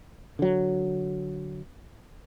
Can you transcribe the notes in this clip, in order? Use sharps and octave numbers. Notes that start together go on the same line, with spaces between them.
D3 F#3